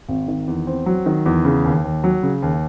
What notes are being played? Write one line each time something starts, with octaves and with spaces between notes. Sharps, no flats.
G#1
D#3
E2
C4
F#3
D#3
E2
C#3
D#2
D#2
F#3
C#3
D#2